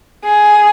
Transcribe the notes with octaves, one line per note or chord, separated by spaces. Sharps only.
G#4